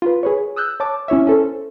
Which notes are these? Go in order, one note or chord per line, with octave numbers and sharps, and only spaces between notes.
F4 B4
G#4 B4 C#5
D#6 E6 F#6 G6
C#5 A5 D6
C#4 E4 C#5 E5
C#4 A4 C5